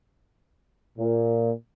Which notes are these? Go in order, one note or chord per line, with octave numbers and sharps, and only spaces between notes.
A#2